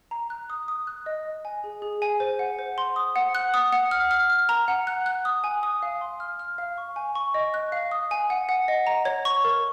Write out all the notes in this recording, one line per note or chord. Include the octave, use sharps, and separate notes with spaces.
A#5
F#6
D#6
D#6
F#6
D#5
D#5
G#5
G#4
G#4
G#5
C5
F#5
C5
C6
D#6
F#5
F#6
D#6
F#5
F6
F6
F6
A#5
F#5
F#6
F#6
D#6
G#5
D#6
F5
C6
F6
F6
F5
C#6
G#5
C#6
D#5
F#6
F5
D#6
G#5
F#5
F#5
D#5
A#5
C#5
C#6
A#4